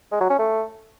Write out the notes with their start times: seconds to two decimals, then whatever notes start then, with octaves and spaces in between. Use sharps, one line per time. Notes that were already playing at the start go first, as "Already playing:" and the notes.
0.12 G#3
0.21 F#3
0.30 C#4
0.39 A3